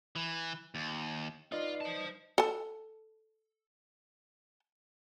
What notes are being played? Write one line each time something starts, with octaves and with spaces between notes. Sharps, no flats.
E3
D#2
D#4 F4 B4 D5 D#5
C5 A5
A4 A5